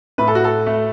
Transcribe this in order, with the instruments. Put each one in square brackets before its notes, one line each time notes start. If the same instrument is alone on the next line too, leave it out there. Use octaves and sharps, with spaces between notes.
[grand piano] A2 B4
A4
F#4
A4
A3